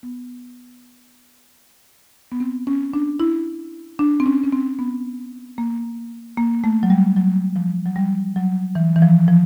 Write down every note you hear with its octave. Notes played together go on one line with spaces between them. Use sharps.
B3
B3
C4
C#4
D4
E4
D4
C4
C#4
C#4
C4
B3
A#3
A#3
A3
F#3
G3
F#3
F3
F#3
G3
F#3
E3
E3
F3
F3